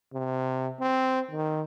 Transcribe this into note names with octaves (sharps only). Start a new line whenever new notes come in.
C3
C4
D#3